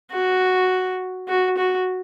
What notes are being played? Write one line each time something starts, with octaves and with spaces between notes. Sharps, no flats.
F#4
F#4
F#4